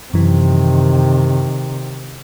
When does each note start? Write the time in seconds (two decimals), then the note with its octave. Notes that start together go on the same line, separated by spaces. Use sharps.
0.14 F#2 C3 D#3 E3